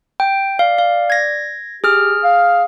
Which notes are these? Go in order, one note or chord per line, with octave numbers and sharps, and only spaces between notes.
G5
D5 F5
F5
G#6 A#6
G4 G#4 F6
F5